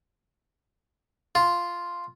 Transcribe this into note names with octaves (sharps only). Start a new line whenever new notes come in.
F4